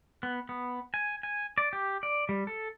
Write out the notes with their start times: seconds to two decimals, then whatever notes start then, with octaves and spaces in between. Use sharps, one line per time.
0.23 B3
0.49 B3
0.94 G#5
1.23 G#5
1.58 D5
1.73 G4
2.03 D5
2.29 G3
2.47 A4